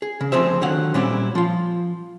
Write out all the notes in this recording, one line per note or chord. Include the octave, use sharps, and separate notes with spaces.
G#4
C#3
D2 F3 C4 G#4 C5 E5
D3 D#3 F#3 F5 F#5
A#2 G3 C4 C#4 E4
F3 F4